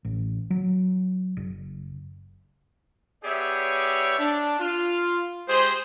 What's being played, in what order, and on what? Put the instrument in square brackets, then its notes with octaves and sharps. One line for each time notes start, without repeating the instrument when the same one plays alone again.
[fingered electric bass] A1
F#3
F#1
[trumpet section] B3 G4 G#4 C#5 D5 E5
D4
F4
G#3 G4 G#4 C5